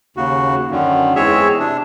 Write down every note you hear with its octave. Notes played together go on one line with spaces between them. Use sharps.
D#2 C#3 F#4
F#2 D3 D#3
E2 G#3 C4 G#4 C#5 E5
C3 D4